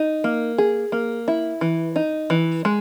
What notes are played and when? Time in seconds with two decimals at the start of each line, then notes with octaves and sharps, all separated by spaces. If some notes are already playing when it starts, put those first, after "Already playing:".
Already playing: D#4
0.24 A#3
0.58 G#4
0.92 A#3
1.28 E4
1.61 E3
1.96 D#4
2.30 E3
2.65 G#3